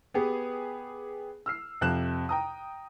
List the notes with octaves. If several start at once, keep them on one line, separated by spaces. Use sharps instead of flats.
B3 G4 G#4 B4
E6 F6 C7
F2 C3 F#6 E7
G5 A#5 D#6